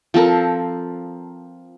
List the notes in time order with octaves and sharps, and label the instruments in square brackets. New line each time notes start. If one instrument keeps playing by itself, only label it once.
[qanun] F3 C4 A4 A#4